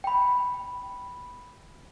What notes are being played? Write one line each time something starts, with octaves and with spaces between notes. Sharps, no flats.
G5 B5